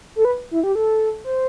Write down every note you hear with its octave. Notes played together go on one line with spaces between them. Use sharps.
A4
B4
E4
G4
A4
C5